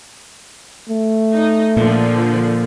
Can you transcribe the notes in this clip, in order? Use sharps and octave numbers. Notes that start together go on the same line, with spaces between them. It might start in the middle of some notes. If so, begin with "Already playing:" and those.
A3
D#4
A#2 D3 F3